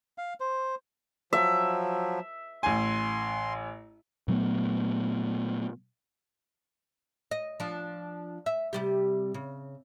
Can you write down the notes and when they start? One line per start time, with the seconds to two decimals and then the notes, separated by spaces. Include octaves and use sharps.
0.18 F5
0.40 C5
1.33 F3 F#3 E5
2.63 A1 G#5 C6
4.28 A#2 F#3 A3 B3
7.31 D#5
7.60 F3 D4
8.46 E5
8.73 C3 G3 G4
9.34 C#3